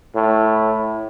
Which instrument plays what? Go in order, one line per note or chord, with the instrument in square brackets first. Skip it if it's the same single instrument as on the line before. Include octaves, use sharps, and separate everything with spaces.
[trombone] A2